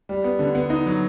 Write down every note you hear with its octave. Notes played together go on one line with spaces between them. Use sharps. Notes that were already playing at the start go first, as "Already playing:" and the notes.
G3
B3
D3
B3
D#4
F#3